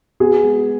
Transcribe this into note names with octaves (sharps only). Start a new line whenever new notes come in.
B3 G#4
G#3